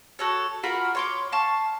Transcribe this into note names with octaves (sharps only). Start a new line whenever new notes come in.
F#4 A4 C#5
F4 F#4 A#4 B5
C#5 C6 D6
F5 A5 C#6